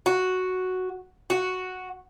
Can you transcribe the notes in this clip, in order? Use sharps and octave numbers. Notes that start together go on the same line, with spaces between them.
F#4
F#4